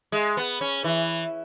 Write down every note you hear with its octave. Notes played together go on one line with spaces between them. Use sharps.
G#3
B3
C#4
E3